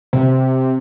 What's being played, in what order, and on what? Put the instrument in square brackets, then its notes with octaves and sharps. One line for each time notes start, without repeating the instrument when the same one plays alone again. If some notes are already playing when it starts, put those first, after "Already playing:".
[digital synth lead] C3